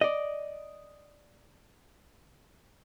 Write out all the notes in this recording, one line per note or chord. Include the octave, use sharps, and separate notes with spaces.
D5 D#5